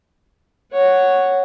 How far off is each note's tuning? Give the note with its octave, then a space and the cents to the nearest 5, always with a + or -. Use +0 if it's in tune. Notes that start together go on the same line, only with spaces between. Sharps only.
C#5 +0 F#5 +0